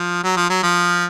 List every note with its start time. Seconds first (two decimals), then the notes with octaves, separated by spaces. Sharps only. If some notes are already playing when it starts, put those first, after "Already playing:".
Already playing: F3
0.23 F#3
0.36 F3
0.49 F#3
0.63 F3